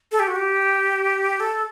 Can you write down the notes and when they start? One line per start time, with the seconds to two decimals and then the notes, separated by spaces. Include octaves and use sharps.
0.12 A4
0.19 G4
0.27 F#4
0.36 G4
1.40 A4